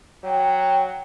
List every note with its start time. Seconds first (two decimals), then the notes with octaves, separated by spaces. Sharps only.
0.24 F#3 G5